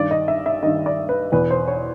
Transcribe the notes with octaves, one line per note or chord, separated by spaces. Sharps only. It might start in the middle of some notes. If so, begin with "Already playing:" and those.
Already playing: G2 D#3 D5
D#5
E5
E5
G2 D#3 D#5
D5
B4
E2 B2 B4
C5
C#5